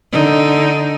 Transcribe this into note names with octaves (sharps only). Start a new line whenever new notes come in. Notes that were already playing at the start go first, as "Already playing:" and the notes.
D3 D#4